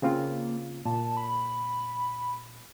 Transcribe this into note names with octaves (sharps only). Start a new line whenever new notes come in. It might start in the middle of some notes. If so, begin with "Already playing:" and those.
C#3 A#3 C4 F4
A#2 A5
B5